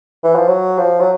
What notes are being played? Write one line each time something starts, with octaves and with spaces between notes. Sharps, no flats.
E3
F3
F#3
F3
F#3